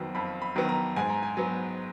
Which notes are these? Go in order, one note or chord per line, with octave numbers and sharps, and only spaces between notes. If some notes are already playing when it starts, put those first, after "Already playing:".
Already playing: F2 D#3 F#3 B3
F2 B5
B5
D#3 F#3 B3
A#5
G#2 G#5
A#5
G#5
F#3 B3